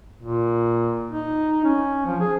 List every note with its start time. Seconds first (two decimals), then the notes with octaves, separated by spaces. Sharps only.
0.23 A#2
1.11 D#4
1.64 C#4
2.06 F3
2.20 G#4